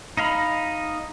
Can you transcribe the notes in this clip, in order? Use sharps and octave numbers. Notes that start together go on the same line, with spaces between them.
D#4 D#5 F5 A#5 B5